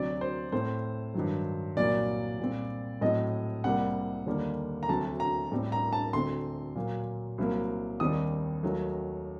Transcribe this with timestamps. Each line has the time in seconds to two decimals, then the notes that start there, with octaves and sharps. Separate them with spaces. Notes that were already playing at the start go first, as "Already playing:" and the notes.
Already playing: D2 C3 F#3 D5
0.21 C5
0.52 A2 A3 C4 C5
1.14 G2 D#3 F#3
1.77 C2 A#2 F#3 A#3 D5
2.40 A#2 G3 C4
3.01 A2 F#3 A3 C4 D#5
3.64 C2 C3 G3 A#3 F#5
4.26 D#2 D3 G3 A#3
4.83 A#5
4.88 D2 C3 F#3 A3 A5
5.20 A#5
5.52 A2 G3 C4
5.72 A#5
5.93 A5
6.13 D2 D3 A3 C4 C6
6.75 A#2 F#3 A#3
7.38 C2 C3 F#3 A#3
8.00 D#2 D#3 G3 C4 D#6
8.63 D#2 D#3 F#3 A3